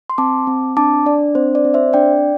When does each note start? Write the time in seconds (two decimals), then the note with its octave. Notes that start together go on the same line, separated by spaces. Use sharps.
0.10 C6
0.18 C4 A5 D6
0.47 C4
0.77 D4 A5 D6
1.06 D4 D5
1.35 C4 C5
1.55 D5
1.65 C4
1.74 C5 E5
1.93 D4 D5 G5